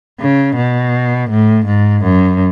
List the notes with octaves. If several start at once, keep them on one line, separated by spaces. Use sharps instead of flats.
C#3
B2
A2
G#2
F#2